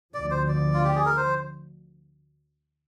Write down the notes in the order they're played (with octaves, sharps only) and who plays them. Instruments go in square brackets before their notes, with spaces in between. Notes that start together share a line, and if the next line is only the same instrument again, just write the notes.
[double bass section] D2 D3 F3 [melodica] D5
[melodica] C5
D5
F4
G4
G#4
A#4
C5